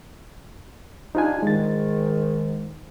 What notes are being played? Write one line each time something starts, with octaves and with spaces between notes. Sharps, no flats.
F3 G3 D4 D#4 F4 G#5
G#2 D#3 G#3 A6